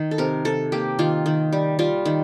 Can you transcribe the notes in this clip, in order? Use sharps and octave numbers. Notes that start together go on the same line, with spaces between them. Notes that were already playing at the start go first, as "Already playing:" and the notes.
Already playing: D#3
A4
C3 A#4
C3 A4
A#3 G4
D#3 F4
D#3
G3
G3 F4
D#3